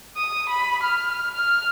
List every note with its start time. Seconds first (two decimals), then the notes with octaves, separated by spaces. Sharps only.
0.16 D#6
0.49 B5
0.83 F6
1.33 F6